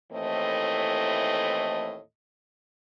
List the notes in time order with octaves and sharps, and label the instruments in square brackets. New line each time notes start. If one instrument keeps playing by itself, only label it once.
[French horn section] D#2 A2 E3 A3 C4 D#5